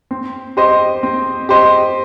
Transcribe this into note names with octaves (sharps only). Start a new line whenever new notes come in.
C4
G4 C5 D#5
C4
G4 C5 D#5